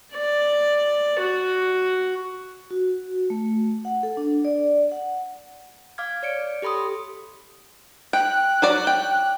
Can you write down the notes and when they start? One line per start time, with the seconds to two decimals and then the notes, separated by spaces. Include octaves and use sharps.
0.14 D5
1.19 F#4
2.71 F#4
3.30 A3
3.85 F#5
4.03 A4
4.17 D4
4.45 D5
4.92 F#5
5.98 F5 D6 F6 G#6
6.23 C#5 D5 C#7 D7
6.62 G4 A4 B5 C6 D#6
8.13 G5 F#6
8.62 F#3 F#4 D5
8.87 G5